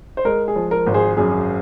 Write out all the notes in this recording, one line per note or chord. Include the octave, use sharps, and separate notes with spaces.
C5
G#3 A#4
G#4
F3
A#4
G#1
G#4 C5
F#2 G#4